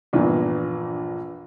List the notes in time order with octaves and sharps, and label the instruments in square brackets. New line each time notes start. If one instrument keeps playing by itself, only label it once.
[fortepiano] A#1 E2 G2 A#2